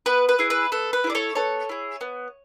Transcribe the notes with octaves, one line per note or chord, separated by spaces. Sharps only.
B3 B4
B4
E4 G#4
B4
B3 A4
B4
E4 G#4
D5
A4 C#5
B3 A4 C#5
E4 G#4
B3